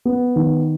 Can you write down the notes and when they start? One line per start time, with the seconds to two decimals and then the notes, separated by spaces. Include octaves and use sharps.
0.05 B3
0.36 D#3